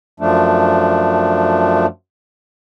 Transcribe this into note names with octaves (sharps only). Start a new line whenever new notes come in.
F#2 F3 A3 D4